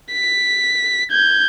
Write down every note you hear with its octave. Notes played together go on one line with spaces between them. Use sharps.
B6
G6 G#6